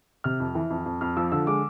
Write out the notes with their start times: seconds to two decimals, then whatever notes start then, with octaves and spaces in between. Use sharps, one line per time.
0.24 C3 F6
0.40 F2
0.55 E3
0.70 F2
0.86 F2
1.01 F2 F6
1.17 F3 E6
1.32 D3 E6
1.47 G#3 D6